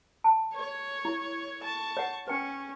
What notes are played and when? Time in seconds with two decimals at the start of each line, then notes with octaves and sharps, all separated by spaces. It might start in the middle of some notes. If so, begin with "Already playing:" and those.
0.24 A5
0.54 C#5
1.05 E4
1.62 A5 C#6
1.97 C#5 F#5
2.28 C#4 B4 G5